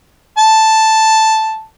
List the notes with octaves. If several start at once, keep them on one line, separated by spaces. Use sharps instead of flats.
A5